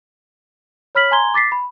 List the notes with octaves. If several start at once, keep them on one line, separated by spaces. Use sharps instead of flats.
C#5 B5 F6 B6 F#7
G#5 A#5 C6 G#6 G7
D6 A6 B6 C7
B5